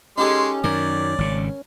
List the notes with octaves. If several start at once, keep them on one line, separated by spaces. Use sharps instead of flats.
G#3 C#4 D#4 G4 A4 C6
F#2 D#3 A#4 D5
G#1 C#3